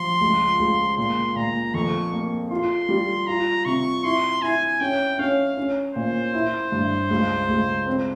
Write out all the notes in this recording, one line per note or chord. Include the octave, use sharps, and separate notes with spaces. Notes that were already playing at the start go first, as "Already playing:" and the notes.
Already playing: F3 C6
C#2
C#2
A#2 C6
A#2 A#5
F2 C#6
A#3
F4 C6
G3
F4 A#5
C3 C#6
E4 C6
E4 G#5
C#4 G5
C#4 F5
C#4
A#2 C5
E4
G2
C#2
C#2
C4